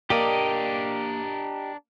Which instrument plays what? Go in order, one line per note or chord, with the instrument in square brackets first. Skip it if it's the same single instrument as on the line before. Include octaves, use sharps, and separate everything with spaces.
[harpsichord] A#3 [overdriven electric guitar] D4 A#4 [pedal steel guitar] G4 D5 D#5